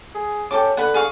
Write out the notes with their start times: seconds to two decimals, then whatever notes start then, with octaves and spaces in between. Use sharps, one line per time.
0.15 G#4
0.51 C#4 G4 A4 D6
0.77 D3 B4 F#5
0.94 G#4 F5 C#6